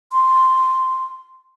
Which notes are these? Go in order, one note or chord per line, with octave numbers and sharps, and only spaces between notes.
C6